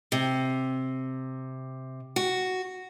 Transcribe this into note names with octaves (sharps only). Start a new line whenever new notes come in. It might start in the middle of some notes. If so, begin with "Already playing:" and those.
C3
F#4